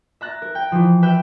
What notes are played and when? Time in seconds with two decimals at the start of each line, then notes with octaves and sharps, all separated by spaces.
0.21 E5 A#5 F#6 A6
0.42 A#4
0.55 G5
0.72 E3 F3
1.02 B4 E5 G5 F#6 G6